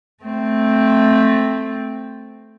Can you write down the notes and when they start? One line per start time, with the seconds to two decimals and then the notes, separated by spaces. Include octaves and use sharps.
0.24 A3 C4